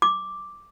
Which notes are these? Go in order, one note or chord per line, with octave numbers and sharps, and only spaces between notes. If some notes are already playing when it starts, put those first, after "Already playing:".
D6